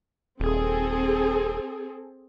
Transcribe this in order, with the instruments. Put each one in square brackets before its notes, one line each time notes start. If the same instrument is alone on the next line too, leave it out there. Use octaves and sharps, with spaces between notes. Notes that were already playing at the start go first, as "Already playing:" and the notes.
[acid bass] D#1 [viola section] C4 G#4 A4